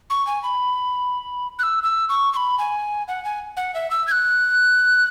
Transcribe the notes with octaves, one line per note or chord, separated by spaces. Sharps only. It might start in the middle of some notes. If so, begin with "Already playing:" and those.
C#6
G#5
B5
F#6
E6
E6
C#6
C#6
B5
G#5
F#5
G#5
F#5
E5
E6
G#6
F#6